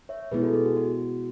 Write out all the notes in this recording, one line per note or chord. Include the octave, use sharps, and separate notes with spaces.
C#5 E5
B2 G#3 B3 E4 G#4 B4
F#4 A4
G#4
F#4
F#4